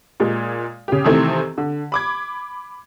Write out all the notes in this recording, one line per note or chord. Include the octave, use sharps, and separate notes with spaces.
A#2 G#3
C#3 G4
C3 D#3 E3 A3 C4
D3
B5 D6 G#6